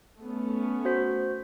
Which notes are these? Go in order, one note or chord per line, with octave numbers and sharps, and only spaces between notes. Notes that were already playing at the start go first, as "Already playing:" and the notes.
A3 B3 C#4
F#4 C5 B6